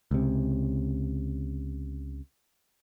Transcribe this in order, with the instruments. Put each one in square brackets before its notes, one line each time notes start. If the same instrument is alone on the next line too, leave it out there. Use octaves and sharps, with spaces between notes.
[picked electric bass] C#2 C3